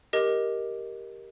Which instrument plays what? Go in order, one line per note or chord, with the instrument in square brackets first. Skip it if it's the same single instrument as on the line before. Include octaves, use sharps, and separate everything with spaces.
[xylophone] G4 A#4 D#5